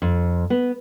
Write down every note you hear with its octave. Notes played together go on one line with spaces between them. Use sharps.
F2
B3